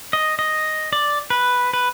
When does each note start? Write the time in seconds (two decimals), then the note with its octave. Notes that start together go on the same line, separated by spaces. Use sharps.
0.13 D#5
0.39 D#5
0.93 D5
1.30 B4
1.73 B4